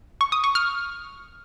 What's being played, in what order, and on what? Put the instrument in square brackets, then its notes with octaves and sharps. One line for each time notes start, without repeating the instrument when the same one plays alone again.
[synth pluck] C#6
D#6
C#6
F6